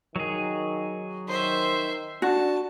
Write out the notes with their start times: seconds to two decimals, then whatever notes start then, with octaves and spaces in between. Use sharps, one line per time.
0.16 D#3 F#3 G#4
1.28 D#3 C5 E5
2.22 D4 F#4 A5